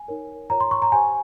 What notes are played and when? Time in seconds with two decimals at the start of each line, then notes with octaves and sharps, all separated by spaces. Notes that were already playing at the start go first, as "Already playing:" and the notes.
Already playing: G#5
0.08 D#4 A#4 C#5
0.50 F4 A#4 C#5 A#5
0.60 C6
0.71 C#6
0.82 A#5
0.92 G4 C5 G#5